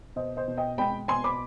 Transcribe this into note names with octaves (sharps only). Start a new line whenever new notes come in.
B2 C5 D#5
C5 D#5
B2
D#5 G5
G#3 G5 B5
B2 G#5 C6
B5 D6